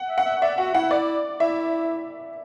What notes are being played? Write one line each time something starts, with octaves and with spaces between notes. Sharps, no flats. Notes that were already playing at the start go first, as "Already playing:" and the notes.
Already playing: F#5
E5
F#5
E5
D5 E5
F#4 F#5
E4 F#5
D5
E4 E5